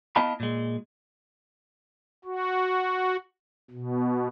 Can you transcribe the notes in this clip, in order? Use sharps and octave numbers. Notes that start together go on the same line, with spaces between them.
B3 E4 D#5 F5 A5 B5
A#2 G#3
F#4
B2